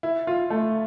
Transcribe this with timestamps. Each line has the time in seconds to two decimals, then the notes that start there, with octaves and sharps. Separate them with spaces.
0.03 E4
0.27 F4
0.50 A3